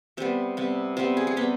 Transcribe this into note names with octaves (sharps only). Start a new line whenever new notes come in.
C3 G3 B3 C5
C3 G3 B3
C3 G3 B3 C5
G#4
G#4
C3 G3 B3 G4